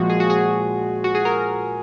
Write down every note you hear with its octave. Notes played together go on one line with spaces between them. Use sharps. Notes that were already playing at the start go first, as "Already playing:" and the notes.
Already playing: A#2 F3 G#3 F#4
G#4
F#4
G#4
F#4
G#4
A#4